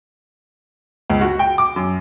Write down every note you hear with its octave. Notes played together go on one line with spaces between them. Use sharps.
C#2
F#4
G5
D6
F#2